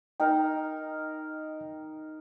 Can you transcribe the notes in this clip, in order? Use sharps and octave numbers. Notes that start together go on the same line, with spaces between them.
D#4 A#4 G5